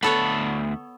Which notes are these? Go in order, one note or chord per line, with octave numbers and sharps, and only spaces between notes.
D2 B3 A4 C#5 B5